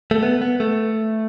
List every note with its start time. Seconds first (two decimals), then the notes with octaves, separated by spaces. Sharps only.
0.11 A3
0.23 B3
0.41 B3
0.60 A3